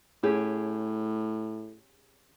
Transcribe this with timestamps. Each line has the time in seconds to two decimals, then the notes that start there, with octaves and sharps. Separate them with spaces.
0.23 A2 C#4 G4 G#4